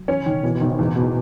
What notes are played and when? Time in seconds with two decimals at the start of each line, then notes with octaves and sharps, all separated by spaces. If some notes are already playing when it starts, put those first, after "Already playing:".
Already playing: F#3
0.08 E3 C#4
0.20 C#3
0.26 D#3
0.31 B2
0.43 B2 E3
0.56 B2
0.61 G#1
0.67 C#3
0.79 E2 A2
0.96 B2